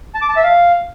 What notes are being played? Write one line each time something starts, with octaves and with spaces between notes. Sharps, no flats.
A5
D6
A5
E5
F5